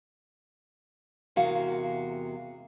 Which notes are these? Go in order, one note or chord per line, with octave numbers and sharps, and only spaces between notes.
E2 C3 G#3 F#4 A#4 F5